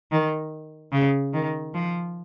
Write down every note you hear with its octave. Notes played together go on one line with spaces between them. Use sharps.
D#3
C#3
D#3
F3